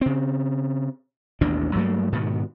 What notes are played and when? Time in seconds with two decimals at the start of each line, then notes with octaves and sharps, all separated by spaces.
0.01 C#3 C4
1.41 A1 D#2 B2 D4
1.75 G2 F#3 A3 A#3
2.12 G#2 B2 D#3 B3